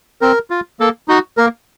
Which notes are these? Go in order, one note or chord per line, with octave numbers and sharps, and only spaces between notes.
C4 A#4
F4
A#3 A4
D#4 F#4
A#3 A#4